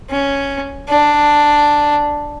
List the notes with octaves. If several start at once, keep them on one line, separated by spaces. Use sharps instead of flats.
C#4
D4